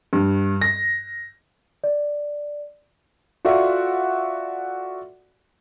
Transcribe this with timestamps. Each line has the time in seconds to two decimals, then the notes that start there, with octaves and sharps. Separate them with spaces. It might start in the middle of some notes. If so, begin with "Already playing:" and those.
0.13 G2
0.61 A#6
1.84 D5
3.45 F4 F#4 A4 D5 E5 F#5